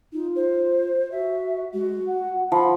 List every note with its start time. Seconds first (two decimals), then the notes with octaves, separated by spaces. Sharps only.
0.13 D#4 F4
0.36 C5
1.12 F#4 E5
1.73 G#3 F#4
2.07 F#5
2.52 F3 F#5 B5